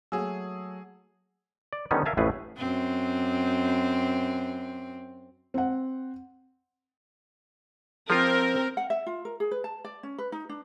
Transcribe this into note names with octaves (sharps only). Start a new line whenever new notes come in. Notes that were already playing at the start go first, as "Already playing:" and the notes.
F#3 A3 A#3 F#4 G#4 G#5 E6
D5
D3 D#3 G3 B3 C#4 D#4
A#4 E5 F5 G#5 A5
A1 F2 A2 A3 G#4 B4
F#2 C4
C4 F#5
F3 C4 F4 A#4
F#5
E5
F4
A#4
G#4
B4
A5
D5
C#4
B4
D#4
D4